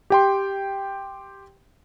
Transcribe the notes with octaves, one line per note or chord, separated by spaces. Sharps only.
G4 G5 C6